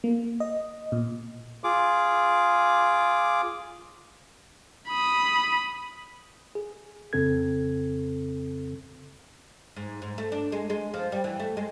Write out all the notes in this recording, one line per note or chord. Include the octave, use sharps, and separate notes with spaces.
A#3
D#5
A#2
F4 G#4 D6
B5 D#6
G#4
F2 C#3 C4 A4 G#6
G#2
G#2
A3
D4
G#3
G#3
F3
G3
E3
A3
G#3